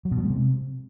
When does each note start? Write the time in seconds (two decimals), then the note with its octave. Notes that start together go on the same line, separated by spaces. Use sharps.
0.05 F#3
0.11 B2
0.17 F#3
0.24 G#3
0.30 C3